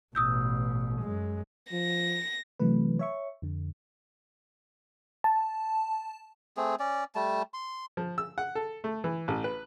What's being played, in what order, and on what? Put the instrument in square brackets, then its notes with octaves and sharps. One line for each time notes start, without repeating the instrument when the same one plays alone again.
[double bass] A1 B2 [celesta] D#6 E6 G6
[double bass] F#2 G#3
[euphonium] F3 [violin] A#6
[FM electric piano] C3 E3 F#3 A3 B4
C#5 E5 C#6
F2 D3
A5
[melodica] A3 C4 G#4
C#4 D5
G3 A3 A5
C6
[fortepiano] F3
E6
F#5
A4
A3
E3
A1
B4